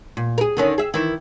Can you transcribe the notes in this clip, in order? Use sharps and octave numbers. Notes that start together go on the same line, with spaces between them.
A#2
G#4 A#4
D3 D#3 C#4
G#4 E5
D#3 E3 E4